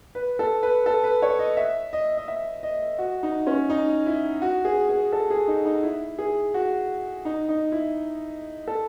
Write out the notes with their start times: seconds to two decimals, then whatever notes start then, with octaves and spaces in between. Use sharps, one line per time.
0.15 B4
0.39 A4
0.63 B4
0.86 A4
1.04 B4
1.22 C#5
1.39 D#5
1.57 E5
1.93 D#5
2.17 D#5
2.28 E5
2.63 D#5
2.99 F#4
3.23 D#4
3.47 C#4
3.70 D#4
4.06 E4
4.42 F#4
4.65 G#4
4.89 G#4
5.12 A4
5.30 G#4
5.48 D#4
5.66 D#4
5.83 E4
6.18 G#4
6.54 F#4
7.25 D#4
7.49 D#4
7.72 E4
8.67 A4